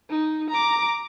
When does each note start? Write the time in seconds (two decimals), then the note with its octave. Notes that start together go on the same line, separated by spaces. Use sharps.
0.10 D#4
0.50 A#5 D6